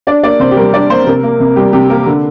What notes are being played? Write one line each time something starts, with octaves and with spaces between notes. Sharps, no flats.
D4 D5
A#3 D5
C3 C5
G4
G3 A#4
D4 D5
A#3 C5
C3 A#4
A#3
C3
G3 G4
C3 G4
A#3 A#4
D3